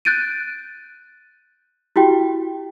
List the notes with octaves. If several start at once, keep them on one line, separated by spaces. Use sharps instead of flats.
F#6 G6 A6 D7 D#7
E4 F#4 G4 G5